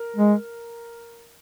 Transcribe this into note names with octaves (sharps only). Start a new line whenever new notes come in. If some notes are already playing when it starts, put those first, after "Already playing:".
Already playing: A#4
G#3